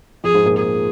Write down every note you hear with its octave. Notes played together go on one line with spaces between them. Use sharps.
F2 F3 G#4
G#2 G#3
A#2 A#3
G#4